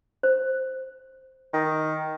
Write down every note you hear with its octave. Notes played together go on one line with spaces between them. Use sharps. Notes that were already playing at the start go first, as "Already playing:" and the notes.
C5
D#3